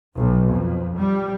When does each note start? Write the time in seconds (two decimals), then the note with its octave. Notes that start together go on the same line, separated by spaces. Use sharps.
0.19 B1
0.52 F2
0.97 G3